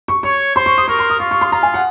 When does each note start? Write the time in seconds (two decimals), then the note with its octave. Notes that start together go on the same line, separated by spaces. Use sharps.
0.08 C#6
0.23 C#5 C#6
0.55 C5 C6
0.66 C#6
0.78 D#6
0.88 A#4 C#6
0.99 C6
1.10 D#6
1.19 F4 C#6
1.31 C#6
1.41 C6
1.52 F4 A#5
1.63 G#5
1.74 F#5